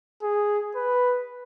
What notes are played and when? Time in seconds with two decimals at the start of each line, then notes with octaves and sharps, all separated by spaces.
0.22 G#4
0.76 B4